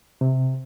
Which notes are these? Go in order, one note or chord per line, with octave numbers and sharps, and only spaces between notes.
C3